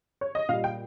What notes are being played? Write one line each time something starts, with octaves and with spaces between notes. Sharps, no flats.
C#5
D#5
A#2 G3 F5
G5